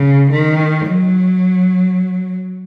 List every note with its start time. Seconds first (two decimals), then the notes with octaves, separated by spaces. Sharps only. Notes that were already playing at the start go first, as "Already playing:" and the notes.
Already playing: C#3
0.31 D#3
0.87 F#3